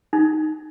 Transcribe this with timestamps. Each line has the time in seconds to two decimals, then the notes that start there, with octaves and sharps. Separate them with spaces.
0.13 D#4